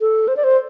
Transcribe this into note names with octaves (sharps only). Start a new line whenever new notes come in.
A4
C5
D5
C5